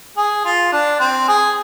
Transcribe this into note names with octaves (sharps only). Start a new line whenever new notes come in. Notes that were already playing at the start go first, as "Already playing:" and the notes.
G#4
F4
D4
C4
G#4